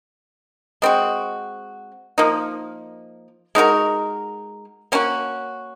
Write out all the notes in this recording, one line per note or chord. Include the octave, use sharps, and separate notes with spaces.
G#3 C4 F#4
F3 A#3 D#4
G#3 D#4 F#4 A#4
A#3 C#4 F#4